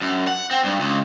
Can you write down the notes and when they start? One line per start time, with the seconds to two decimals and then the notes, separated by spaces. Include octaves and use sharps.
0.01 F#2
0.27 F#5
0.51 C4
0.64 G2
0.80 C#2